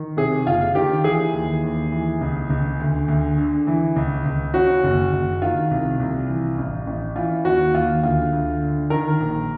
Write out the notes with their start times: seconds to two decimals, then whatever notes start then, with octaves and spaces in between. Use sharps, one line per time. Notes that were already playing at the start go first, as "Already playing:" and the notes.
Already playing: D#3
0.17 C3 G#4
0.47 F#1 F4
0.75 D#3 G4
1.04 E3 G#4
1.34 D#2
1.63 D#2
1.92 E3
2.21 C#2
2.50 C#2
2.80 D2
3.08 D2
3.38 D3
3.67 E3
3.96 C#2
4.25 C#2
4.54 C#3 F#4
4.83 F#1
5.13 F#1
5.42 D#3 F4
5.71 C2
6.00 C2
6.28 E3
6.58 A1
6.87 A1
7.16 E3 F4
7.45 D#2 F#4
7.74 D#2 F4
8.03 D2 F4
8.33 D2
8.62 D3
8.90 D#3 A#4
9.20 A#1